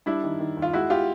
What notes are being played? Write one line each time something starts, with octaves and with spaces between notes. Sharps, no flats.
G3 D4 E4
D#3
D#3
D#2
F4
G#3 E4 F#4
F4 G4